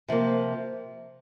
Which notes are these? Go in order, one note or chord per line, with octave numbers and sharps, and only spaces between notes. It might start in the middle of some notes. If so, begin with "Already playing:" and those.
C3 F3 A#3